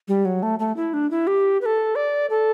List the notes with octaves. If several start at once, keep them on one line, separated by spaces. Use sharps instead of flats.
G3
F#3
A3
A3
E4
D4
E4
G4
B4
A4
D5
A4